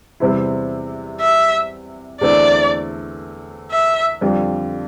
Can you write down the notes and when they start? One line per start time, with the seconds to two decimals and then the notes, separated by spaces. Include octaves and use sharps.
0.20 E2 C3 G3 C4 E4
1.21 E5
2.21 E2 D3 A3 C4 E4 D5
3.72 E5
4.21 F2 D3 G3 D4 F4